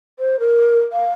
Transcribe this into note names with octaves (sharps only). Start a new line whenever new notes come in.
C5
A#4
F5